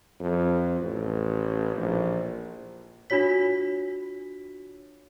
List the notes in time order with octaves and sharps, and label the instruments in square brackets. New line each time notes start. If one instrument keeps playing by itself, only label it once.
[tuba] F2
A1
A#1
[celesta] D4 F4 F#4 C#5 B6